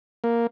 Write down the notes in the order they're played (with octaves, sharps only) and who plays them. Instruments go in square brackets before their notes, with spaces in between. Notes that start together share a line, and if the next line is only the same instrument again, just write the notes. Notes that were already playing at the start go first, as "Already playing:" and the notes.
[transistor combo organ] A#3